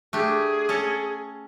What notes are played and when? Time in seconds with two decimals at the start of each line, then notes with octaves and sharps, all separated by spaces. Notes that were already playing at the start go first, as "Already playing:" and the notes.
0.13 A3 D4 G4 G#4
0.69 C#4 A4 C#5